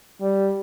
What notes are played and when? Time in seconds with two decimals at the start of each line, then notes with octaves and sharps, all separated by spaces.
0.21 G3